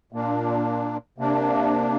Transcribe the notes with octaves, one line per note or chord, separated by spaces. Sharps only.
A#2 A#3 D4
C3 A#3 D4